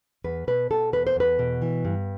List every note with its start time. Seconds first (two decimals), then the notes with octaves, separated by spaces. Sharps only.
0.24 E2 B4
0.47 B2 B4
0.70 B2 A4
0.93 E2 B4
1.07 C5
1.16 E2 B4
1.39 B2
1.62 E3
1.85 G2